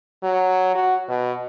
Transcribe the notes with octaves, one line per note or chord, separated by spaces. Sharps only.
F#3
F#4
B2